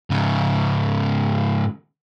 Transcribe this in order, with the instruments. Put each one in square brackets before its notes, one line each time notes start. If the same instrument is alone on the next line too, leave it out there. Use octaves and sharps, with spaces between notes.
[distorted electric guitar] G#2 C#3